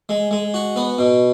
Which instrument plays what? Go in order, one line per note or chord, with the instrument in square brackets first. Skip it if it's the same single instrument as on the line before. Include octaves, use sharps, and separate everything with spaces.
[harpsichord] G#3
G#3
F#4
B3
B2